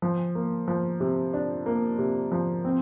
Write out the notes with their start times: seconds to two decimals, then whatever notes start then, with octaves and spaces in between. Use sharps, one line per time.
0.02 F3
0.35 A#3
0.68 F3
1.00 C3
1.34 D4
1.66 A#3
1.99 C3
2.32 F3
2.65 C4